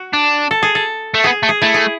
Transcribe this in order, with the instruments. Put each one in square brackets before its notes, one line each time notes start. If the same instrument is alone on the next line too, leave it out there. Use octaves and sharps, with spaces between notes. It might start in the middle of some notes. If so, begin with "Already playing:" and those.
Already playing: [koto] F#4
[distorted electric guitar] D4
[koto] A4
G#4
A4
[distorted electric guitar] A3
[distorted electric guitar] B3 [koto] G#4
[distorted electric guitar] A3
[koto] G#4
[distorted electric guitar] A3 [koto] E4
[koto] G#4